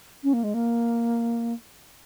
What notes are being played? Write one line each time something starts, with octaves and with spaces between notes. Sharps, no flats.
C#4
A#3
G#3
A#3